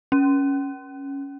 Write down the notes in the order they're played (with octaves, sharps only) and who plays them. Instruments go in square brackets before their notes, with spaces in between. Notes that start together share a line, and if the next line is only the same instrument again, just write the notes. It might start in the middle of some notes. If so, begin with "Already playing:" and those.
[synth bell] C#4